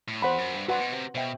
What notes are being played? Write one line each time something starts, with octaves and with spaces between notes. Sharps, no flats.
A2
E2 C5 F#5 B5
F#2
G2
G2 F#4 B4 F#5 C6
B2
C3
B2 C5 E5 G5